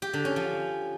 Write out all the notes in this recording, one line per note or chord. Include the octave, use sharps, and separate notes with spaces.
G4
D3
C#4
F3